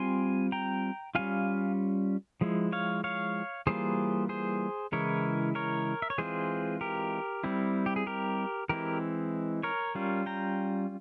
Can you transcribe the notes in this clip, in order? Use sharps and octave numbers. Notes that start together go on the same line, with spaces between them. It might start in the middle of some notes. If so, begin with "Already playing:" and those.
Already playing: G3 C4 F4 G#5 C6
G5 A#5
G3 C#4 F4 F5 G#5
F3 G#3 E4
C#5 F5
C#5 F5
E3 G3 A#3 F4 G#4 C5
G#4 C5
C#3 E3 G#3 E4 A#4 C#5
A#4 C#5
E5
C#5
E3 G#3 C4 F4 G#4 C5
G4 A#4
G3 C4 E4
G4
G#4
G4 A#4
E3 G#3 C4 E4 G4 A#4
A#4 C#5
G3 C#4 F4
G5 A#5